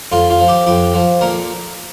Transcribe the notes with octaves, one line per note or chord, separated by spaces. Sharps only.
F2 F4
F4
F3
G4
F2 G4
F3
A#2 A#4